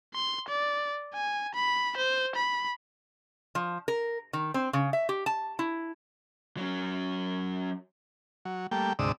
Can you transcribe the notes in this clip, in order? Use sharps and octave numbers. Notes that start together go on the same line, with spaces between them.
C6
D5
G#5
B5
C5
B5
F3
A#4
D#3
C4
C#3
E5
G4
A5
E4
F#3 C#4
F#3
G3 A3 A#3 G5
D2 G#2 C3 D5 D#6 E6